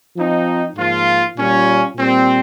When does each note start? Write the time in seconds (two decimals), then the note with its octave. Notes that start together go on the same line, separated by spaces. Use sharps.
0.17 F3 C4 D#4
0.76 G#2 F3 A#3 F4
1.37 A#2 G3 C#4 F4
1.96 A#2 G3 C4